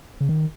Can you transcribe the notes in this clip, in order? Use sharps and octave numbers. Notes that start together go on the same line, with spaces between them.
C#3
D#3